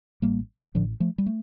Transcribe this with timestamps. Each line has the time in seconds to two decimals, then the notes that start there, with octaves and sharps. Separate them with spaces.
0.22 A1 A2 G3 A#3
0.74 A1 A2 D3 F3
1.00 F3 A3
1.18 G3
1.26 A3